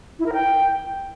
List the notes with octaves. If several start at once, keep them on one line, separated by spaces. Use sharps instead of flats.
E4
A#4
G5